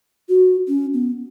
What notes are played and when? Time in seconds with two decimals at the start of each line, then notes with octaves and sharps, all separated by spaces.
0.29 F#4
0.68 C#4
0.94 B3